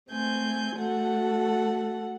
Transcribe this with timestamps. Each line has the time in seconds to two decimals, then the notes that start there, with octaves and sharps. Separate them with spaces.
0.11 A3 C4 G#5 G6
0.77 A3 F#4 A4 F#5